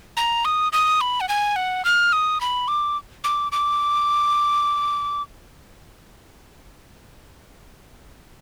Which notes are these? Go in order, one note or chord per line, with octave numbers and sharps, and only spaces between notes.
A#5
D#6
D#6
B5
F#5
G#5
F#5
F6
D#6
B5
D6
D6
D6